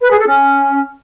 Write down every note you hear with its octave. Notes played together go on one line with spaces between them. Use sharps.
B4
G#4
A4
C#4